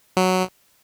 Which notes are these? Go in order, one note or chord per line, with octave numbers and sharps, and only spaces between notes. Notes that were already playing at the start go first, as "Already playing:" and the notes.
F#3